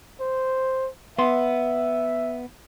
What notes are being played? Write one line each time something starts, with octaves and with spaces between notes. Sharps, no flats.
C5
B3 E5 C6